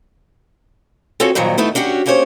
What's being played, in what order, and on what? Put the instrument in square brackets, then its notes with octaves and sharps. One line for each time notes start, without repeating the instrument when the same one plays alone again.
[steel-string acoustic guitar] C4 F4 F#4 G#4 A4 C#5
G2 A#2 D#3 F3 F#3
A3 B3 D#4 E4
C#4 D4 F#4 G4
A#3 C#4 G4 C5 C#5